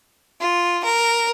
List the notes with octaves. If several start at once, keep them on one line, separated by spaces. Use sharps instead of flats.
F4
A#4